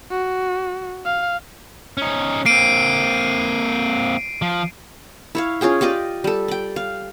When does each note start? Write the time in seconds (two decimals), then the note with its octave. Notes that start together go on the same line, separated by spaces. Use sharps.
0.11 F#4
1.06 F5
1.97 C#4 D#4
2.46 A#3 C4 C7 D7 D#7
4.42 F3
5.35 E4 C#5 F5
5.61 C#4 F4 G#4 G5
5.81 F4 G4 D5 D#5
6.24 G3 A4
6.48 D5 G5
6.76 F5